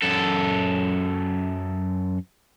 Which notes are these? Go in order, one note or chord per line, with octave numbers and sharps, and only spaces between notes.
F#2 A4